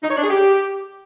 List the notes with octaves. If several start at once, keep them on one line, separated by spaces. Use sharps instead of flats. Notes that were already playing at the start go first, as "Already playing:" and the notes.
D#4
C#5
D4
G#4
G4